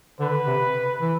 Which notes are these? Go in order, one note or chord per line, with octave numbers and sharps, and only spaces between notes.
D3 B4
C3
E3